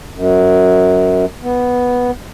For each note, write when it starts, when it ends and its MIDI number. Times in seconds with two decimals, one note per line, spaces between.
0.15 1.25 42
1.42 2.11 59